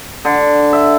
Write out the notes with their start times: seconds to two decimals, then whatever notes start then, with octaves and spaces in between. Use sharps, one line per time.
0.25 D3
0.73 E5